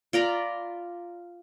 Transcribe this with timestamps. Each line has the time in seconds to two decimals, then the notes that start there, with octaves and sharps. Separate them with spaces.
0.13 F4 D5 A#5 B5